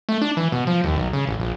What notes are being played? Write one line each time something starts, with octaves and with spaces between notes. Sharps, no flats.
A3
D4
E3
B2
F3
D#2
B1
C#3
A1
A#1